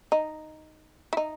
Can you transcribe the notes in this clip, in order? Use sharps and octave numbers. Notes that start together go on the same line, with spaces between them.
D#4
E4
D#4